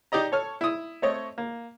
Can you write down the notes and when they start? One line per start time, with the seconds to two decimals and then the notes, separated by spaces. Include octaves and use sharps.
0.12 D#4 G4 D5 D#5 A#5
0.32 A4 C#5 F6
0.61 E4 D#6
1.02 A3 C4 C#5 D#5
1.38 A#3